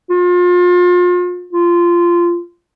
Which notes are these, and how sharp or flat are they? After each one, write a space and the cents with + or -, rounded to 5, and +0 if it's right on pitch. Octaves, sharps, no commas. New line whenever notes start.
F4 +35
F4 -15